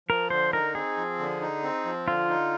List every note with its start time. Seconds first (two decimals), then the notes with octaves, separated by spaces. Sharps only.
0.09 F3 A#4
0.30 D3 C5
0.53 D#4 A#4
0.75 C4 G#4
0.97 F3
1.19 D3
1.41 D#4
1.63 C4
1.85 F3
2.07 D3 F4
2.29 D#4